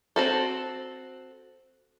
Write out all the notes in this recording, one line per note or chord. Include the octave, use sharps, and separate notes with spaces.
C4 F#4 A4